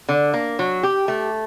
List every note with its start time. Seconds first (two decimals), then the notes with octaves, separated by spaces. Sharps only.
0.09 D3
0.34 A#3
0.59 F#3
0.83 G4
1.08 A3